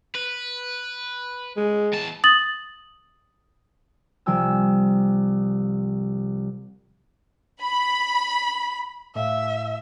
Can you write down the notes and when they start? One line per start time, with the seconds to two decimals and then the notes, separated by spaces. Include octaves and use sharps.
0.16 B4
1.57 G#3
1.93 E2 A5
2.24 D#6 A6 F#7
4.26 C2 F3 G5 G#5 E6
7.61 B5
9.15 A2 E5 F5